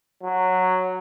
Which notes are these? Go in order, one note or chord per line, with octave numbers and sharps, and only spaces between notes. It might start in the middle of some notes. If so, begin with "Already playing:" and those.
F#3